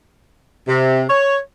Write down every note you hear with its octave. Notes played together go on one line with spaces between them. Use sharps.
C3
C#5